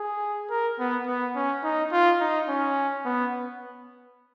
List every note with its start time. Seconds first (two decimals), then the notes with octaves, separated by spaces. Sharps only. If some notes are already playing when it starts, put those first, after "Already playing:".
Already playing: G#4
0.50 A#4
0.79 B3
1.07 B3
1.35 C#4
1.63 D#4
1.92 F4
2.20 D#4
2.48 C#4
3.05 B3